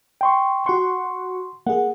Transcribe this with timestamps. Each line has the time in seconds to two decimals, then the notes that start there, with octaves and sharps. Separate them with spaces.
0.21 G5 C6 C#6
0.66 F#4 F#5 C6 C#6
1.66 A#3 G#4 F#5